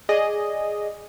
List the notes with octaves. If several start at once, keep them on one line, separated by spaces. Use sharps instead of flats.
G#4 D5 D#5